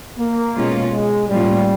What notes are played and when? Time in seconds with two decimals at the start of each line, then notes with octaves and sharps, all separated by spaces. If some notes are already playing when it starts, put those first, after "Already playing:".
0.18 A#3
0.55 B2 G#3 C#4 F4
0.93 G#3
1.29 A2 F3 G3 A#3 C#4 F4